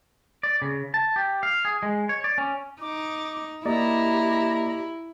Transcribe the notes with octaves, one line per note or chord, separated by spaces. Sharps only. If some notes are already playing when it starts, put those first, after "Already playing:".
D5
C#3
A5
G4
F5
G#4
G#3
C#5
D5
C#4
D#4 D6
A#3 E4 G4 D5 D#5 A#5